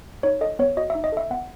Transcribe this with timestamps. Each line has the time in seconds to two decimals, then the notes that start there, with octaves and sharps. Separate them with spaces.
0.23 D#4 C#5
0.41 A4 D#5
0.59 B3 C#5
0.77 F#4 D#5
0.90 E5
0.95 D#4
1.04 D#5
1.12 A4 E5
1.30 B3 F#5